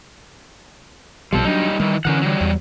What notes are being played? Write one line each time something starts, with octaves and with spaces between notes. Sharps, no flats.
B1 B2 F3 G3 A4
F#3 G3 D4 D#4
D#3 E3 G3
D3 E3 C#4 A#4 F#5
F#3 G3
E2